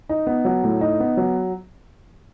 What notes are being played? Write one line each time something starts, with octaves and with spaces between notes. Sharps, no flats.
D#4
B3
F#3
A2
D#4
B3
F#3